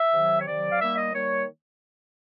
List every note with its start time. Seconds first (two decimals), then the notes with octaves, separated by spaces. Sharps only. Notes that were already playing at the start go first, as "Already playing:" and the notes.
Already playing: E5
0.13 C3 D#3 F#3
0.40 C#5
0.46 C3 D#3 F#3 D5
0.71 F5
0.80 D#3 G3 A#3 E5
0.97 D#5
1.13 D#3 G3 A#3 C#5